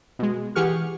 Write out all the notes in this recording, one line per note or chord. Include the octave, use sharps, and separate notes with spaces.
B2 G#3
E3 G4 G#4 F#5 C#6 F6